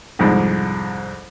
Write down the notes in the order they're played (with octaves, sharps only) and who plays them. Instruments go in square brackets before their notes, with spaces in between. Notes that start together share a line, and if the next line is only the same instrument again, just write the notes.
[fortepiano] C2 F2 G#2